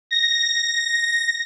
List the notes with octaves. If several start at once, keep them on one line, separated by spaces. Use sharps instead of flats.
A#6